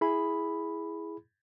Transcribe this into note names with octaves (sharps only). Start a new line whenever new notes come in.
E4 G#4 B5